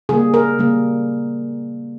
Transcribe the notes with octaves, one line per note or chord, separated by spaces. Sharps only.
C#3 G3 A#3 G#4
A#4
C#3 G3 A#3